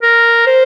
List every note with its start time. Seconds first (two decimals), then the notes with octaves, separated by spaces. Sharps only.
0.03 A#4
0.47 C5